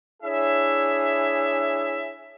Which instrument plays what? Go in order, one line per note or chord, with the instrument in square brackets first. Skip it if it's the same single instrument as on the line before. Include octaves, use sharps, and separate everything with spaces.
[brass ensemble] D4 E4 G#4 C#5 E5